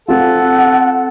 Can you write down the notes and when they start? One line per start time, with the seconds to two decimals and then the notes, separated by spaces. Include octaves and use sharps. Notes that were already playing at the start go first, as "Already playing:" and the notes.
0.08 C4 F4 A4 F#5